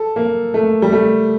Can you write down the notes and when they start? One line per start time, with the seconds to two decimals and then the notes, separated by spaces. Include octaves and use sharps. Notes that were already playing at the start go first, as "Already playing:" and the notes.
Already playing: A4
0.16 A#3
0.54 A3
0.82 G3
0.93 A3